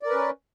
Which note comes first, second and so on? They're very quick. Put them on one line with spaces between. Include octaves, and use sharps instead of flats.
D5 A#4 B4 C#4